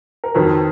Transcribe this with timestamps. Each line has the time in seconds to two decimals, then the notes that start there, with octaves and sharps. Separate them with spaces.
0.24 A#4
0.34 F2 D#3 F#3 B4